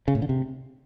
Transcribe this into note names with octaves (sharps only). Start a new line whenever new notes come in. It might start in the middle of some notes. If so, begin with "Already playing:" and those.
C#3
A2
D3
C3